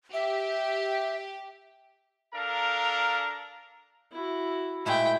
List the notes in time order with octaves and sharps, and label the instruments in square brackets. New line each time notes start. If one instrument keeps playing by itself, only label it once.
[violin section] G4 [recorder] E5
[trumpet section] D4 A4 A#4 F5 A#5
[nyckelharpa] E4 F#4
[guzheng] A#2 G#3 A3 [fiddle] E4 G5